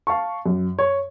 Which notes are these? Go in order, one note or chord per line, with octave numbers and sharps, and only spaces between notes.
F5 A5 C#6
F#2
C#5